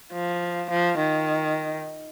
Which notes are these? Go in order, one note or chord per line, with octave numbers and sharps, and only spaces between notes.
F3
F3
D#3